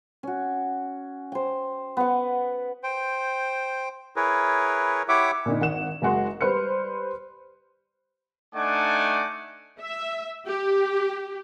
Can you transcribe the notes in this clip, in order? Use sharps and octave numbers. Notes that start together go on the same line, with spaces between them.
C#4 F#4
C5 G5
B3 F#5
C5 G5
E4 G#4 A#4 B4 C#5
E4 G4 C#5 E5 F#5 D6
A#2 D3 D#4
G#1 F#5 E7
F#1 G#3 F#4 C6
G3 B4 C5 F6 C#7
A3 D4 D#4 F#5 G#5 D6
E5
G4